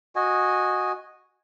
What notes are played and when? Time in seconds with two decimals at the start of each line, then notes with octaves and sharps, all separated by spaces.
0.16 F#4 D#5 G#5